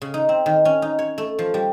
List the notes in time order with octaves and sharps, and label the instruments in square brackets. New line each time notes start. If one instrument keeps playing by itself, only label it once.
[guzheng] C#3
D#4
C4
D#3
C#4
D#4
C#5
A3
F3
G3